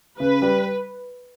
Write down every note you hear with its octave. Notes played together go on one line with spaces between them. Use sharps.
C#3 B4
G3